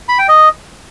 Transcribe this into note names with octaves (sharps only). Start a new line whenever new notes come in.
B5
G5
D#5